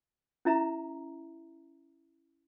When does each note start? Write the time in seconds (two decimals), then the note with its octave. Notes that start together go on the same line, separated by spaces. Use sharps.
0.45 C#4 E4 E5 A#5